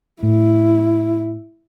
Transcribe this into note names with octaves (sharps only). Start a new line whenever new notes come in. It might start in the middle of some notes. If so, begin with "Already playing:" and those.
A2 E4